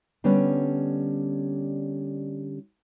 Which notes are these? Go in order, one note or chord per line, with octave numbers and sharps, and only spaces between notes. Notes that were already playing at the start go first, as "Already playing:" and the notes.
D3 G3 B3 C#4 D4